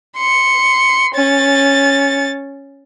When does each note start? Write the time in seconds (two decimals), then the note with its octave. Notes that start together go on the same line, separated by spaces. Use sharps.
0.16 C6 C#7
1.14 C#4 A6